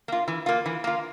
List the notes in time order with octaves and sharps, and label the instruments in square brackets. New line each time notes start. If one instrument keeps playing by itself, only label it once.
[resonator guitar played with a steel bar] A#3 F4
E3
A#3 F4
E3
A#3 F4